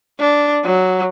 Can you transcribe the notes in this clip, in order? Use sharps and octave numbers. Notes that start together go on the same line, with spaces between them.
D4
F#3